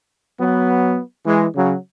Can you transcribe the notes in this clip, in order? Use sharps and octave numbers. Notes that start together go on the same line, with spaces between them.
F#3 B3
E3 G#3
C#3 F#3